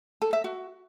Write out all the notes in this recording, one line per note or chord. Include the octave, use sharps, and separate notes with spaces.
A4
E5
F#4